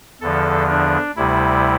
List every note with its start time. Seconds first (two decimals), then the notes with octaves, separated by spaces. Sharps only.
0.21 E2 D3 F3 A4
0.69 D4
1.16 D2 C3 G3 E4